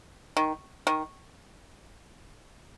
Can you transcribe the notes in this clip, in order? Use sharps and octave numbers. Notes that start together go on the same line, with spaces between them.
D#3
D#3